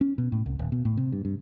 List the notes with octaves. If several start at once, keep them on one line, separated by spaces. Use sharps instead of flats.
C#4
B2
A2
C2
D#1
B2
A2
C3
G2
G2